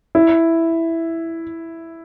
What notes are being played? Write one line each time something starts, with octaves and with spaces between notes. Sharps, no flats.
E4